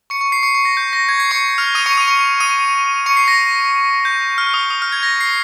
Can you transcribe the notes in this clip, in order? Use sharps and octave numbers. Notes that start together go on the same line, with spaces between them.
C#6 C#7
C#6 C#7
C7
C#6 C#7
C#6 C#7
A#6
G6
A#6
G#6
C7
C#6 C#7
F6 F7
D#6 D#7
C#6 C#7
D#6 D#7
C#6 C#7
D#6 D#7
C#6 C#7
C7
A#6
G6
F6
D#6
D#6
F6
G#6
A#6
C7